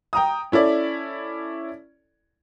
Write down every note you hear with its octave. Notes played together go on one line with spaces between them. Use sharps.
G5 A#5 D#6
C#4 E4 A4 D5